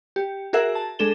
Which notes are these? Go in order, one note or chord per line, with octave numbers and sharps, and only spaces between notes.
G4
F#4 G#4 A#4 E5 F#5
A5
G#3 D4 G#4 A4 E7 G7